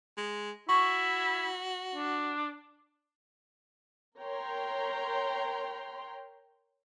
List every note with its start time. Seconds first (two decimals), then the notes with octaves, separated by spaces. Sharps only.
0.17 G#3
0.69 E4 F#4 C#6
1.94 D4
4.19 A#4 C#5 G5 A#5 C6